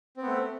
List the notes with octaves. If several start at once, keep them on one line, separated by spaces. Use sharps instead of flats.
A3 B3 C4